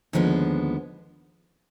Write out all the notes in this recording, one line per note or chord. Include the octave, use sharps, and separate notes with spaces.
D#2 D3 F3 G#3 B3